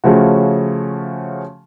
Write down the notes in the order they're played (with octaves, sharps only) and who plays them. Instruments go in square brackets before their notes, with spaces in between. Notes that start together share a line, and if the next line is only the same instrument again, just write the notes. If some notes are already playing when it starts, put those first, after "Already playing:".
[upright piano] C#3 F3 A3 C#4 F#4